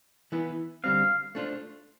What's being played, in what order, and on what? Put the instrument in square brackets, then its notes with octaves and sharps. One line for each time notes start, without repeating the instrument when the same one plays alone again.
[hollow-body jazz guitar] E3 B3 E4 B4
[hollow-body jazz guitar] D3 G3 C4 [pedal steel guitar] F5
[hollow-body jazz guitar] A3 D4 F4 C5